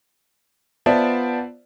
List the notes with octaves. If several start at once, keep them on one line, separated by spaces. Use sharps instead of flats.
B3 F4 C5 D5 E5 A5